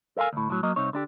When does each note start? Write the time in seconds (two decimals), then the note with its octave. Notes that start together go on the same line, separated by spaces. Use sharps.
0.17 A4 A#4 E5 F5 G#5
0.33 D2 A2
0.50 A2 F#3
0.63 F#3 A#3 D#5
0.76 C2 C4 D#4 C#5
0.93 D3 D4 G4